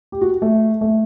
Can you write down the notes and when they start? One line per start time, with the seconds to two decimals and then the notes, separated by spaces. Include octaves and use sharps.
0.12 G4
0.21 F#4
0.42 A3
0.81 A3